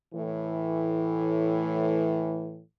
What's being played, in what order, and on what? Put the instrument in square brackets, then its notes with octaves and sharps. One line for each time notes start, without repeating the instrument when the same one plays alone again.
[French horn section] A2 E3